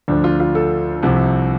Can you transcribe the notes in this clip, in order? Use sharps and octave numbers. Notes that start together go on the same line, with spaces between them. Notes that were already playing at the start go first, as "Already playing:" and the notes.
D2 D3 F3 D4
F4
F4
A4
C2 C3 F3